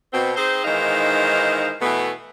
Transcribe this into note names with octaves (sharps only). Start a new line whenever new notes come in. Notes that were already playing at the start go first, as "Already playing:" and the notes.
B2 C4
C4 D#4 G#4 C5
D#3 E3 G#3 D#4 C5 F5
B2 E3 A3 B3